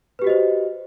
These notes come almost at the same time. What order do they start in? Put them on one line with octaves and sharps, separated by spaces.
B4 G4 F#4 D#5 C5